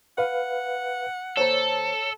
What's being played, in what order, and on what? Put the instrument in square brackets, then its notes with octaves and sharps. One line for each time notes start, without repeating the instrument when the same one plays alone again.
[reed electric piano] B4 F5 [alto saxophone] F#5
[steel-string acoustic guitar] D#2 C5 A#5 [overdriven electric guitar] A4 [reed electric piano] C#5